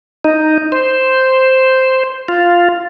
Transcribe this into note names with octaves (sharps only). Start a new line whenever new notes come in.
D#4
C5
F4